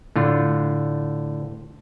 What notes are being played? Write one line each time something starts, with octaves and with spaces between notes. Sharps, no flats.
A2 D3 F4